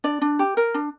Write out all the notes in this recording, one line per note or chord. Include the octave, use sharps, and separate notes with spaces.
D4 D5
D4
G4
A#4
D4